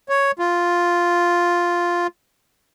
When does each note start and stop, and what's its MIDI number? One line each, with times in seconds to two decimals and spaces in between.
0.09 0.31 73
0.39 2.07 65